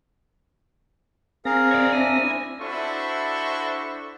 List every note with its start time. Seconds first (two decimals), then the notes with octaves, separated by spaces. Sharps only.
1.45 C4 G#4 A#4 F5 A#6
1.71 C#5 D5
1.93 D4 E5 G#5
2.23 E4
2.61 D4 E4 F#4 A4 C5 C#6